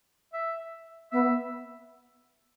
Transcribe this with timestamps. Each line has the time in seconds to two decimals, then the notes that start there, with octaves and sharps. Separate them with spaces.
0.33 E5
1.12 B3 E5